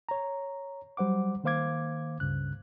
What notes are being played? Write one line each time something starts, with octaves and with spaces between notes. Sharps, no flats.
C#5 A#5
F#3 G3 C5 F#5 D6
D#3 A#3 C5 F5 D6 G#6
C#2 G2 C#3 F#6